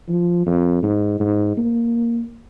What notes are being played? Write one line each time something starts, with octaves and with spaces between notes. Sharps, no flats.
F3
F2
G#2
G#2
A#3